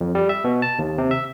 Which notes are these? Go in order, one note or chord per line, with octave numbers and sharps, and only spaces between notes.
F2
G3
E5
B2
A5
D#2
C3
E5